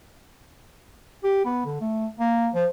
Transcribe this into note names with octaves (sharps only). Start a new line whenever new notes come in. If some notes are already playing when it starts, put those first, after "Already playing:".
G4
B3
D3
A3
A#3
F3